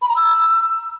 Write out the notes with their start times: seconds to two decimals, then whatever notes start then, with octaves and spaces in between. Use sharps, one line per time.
0.02 B5
0.09 A#5
0.16 E6